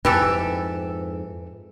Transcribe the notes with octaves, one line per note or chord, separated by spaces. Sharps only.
F2 G#2 E3 G4 A4